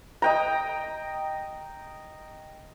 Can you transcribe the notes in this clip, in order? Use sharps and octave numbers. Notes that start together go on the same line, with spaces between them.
D#5 G5 A#5